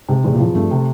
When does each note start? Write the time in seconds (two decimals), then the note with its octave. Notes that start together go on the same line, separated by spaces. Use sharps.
0.09 G#2 C3
0.24 E2 G#2
0.33 A#2
0.39 A2 F3
0.55 G2 A3
0.71 C3